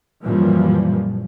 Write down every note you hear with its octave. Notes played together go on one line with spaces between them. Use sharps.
F#2 A#2 E3 F3 G3